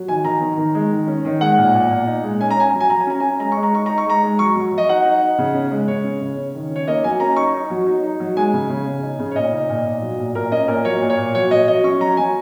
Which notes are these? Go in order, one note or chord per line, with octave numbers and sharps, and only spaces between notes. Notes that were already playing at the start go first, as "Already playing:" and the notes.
Already playing: F#3
D#3 G#5
D#3 A#5
D#3
D#3
G#3
D#3
C#4
D#3
G#3 F#5
A#2
A#2
A#2
D#4
G#3
C#4 G#5
A#5
C#4 G#5
F#3 A#5
G#5
F#3 A#5
G#5
C#4 A#5
C#4 G#5
G#3 A#5
G#3 C#6
A#5
D#4 C#6
D#4 A#5
C#6
G#3 A#5
G#3
F#3 C#6
F#3
F#3
D#5
D#4 F#5
D#4
D#4
C#3
C#4
G#3
C#3 C#5
C#4
C#3
C#4
D#3
C#4 C#5
A#3 D#5
F#3 G#5
C#4 A#5
D#4 C#6
D#4
F#3
D#4
D#4
F#3
G#3 G#5
C#3
C#3
C#3
D#4
C#3
C#5
A#2 D#5
D#4
A#2
A#2
F#3
A#2
A#2 A#4
C#4 D#5
A#2 A#4
F#3 C#5
A#2
C#5
A#2
F#3 C#5
F#3 D#5
F#3 D#5
C#4 C#6
F#3 A#5
F#3 G#5